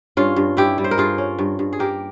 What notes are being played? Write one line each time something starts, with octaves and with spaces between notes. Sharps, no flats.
G2 C#4 F4
G2
G2 E4 G4
G3
C5
A#4
G2 F4 G#4
C#4
G2
G2
G#4
A#3 G4 A#4